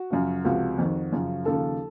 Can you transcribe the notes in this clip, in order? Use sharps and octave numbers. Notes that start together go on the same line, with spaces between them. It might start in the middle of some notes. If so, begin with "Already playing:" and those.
Already playing: F#4
F#2 C#3 F3
C#2 C3 F3 F#4
F2 D#3
F#2 C#3 F3
D#2 C#3 F3 A4